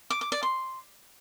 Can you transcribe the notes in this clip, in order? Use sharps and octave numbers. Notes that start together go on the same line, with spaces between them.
D6
D6
D5
C6